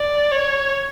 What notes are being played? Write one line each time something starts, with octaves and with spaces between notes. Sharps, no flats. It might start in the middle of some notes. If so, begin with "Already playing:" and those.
Already playing: D5
C#5